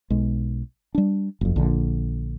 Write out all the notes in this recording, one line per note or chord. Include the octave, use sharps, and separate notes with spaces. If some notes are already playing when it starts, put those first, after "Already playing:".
B1 G#3
G3 D4
F#1 F2
A#1 D3